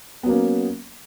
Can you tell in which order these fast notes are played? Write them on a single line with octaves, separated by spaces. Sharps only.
B3 F#3 A#3 C#4